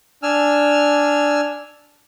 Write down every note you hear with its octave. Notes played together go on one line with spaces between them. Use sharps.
D4 G#5 E6 F6